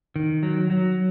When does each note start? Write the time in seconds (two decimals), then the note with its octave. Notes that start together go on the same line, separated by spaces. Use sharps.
0.16 D#3
0.43 F#3
0.70 F#3